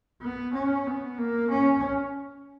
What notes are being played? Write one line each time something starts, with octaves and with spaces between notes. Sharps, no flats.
B3
C#4
B3
A#3
C#4